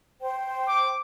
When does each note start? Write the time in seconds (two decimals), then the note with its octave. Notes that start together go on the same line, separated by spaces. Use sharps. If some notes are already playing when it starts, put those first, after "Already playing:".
0.21 C5 G5
0.68 D6